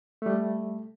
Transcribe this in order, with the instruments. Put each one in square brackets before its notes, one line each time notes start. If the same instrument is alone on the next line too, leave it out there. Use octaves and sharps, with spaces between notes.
[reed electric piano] G3 A3